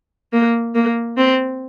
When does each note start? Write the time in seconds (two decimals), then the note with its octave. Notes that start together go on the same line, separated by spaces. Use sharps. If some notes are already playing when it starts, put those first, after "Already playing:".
0.33 A#3
0.75 A#3
1.17 C4